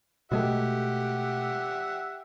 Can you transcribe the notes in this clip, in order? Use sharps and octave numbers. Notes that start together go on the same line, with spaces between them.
B2 G#3 A3 G4 E5 F#5